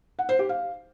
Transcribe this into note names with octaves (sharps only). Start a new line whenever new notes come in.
F#5
C5
G4
F5